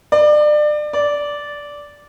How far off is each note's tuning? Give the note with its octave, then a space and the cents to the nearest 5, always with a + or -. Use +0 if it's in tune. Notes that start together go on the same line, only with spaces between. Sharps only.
D5 +30
D5 -10